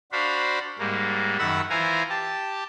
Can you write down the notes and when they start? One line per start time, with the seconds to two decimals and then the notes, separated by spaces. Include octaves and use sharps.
0.12 D4 F#4 C5 F5 B5
0.79 G#2 G3 G#3 A#3
1.38 F#2 D#3 F#5 B5 E6
1.70 E3 E4 F4 C5 G#5 A#5
2.09 G4 A5